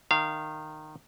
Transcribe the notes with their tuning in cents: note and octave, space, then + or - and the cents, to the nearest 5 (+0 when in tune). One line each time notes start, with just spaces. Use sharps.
D#3 -15 F5 -25